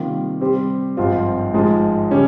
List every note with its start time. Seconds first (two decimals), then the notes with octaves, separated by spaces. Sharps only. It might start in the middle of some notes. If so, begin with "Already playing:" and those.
Already playing: C3 D#3 G3 A#3 F4
0.41 C3 G3 C4 G4
0.97 G#1 G2 F3 C4 F4
1.53 G#1 G#2 F3 G#3
2.11 C#3 G3 C#4